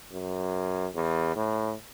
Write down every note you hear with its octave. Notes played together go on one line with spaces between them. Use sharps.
F#2
E2
A2